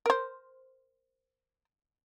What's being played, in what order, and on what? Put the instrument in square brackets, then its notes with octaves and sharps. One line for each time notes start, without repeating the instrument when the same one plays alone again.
[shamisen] A#4 C5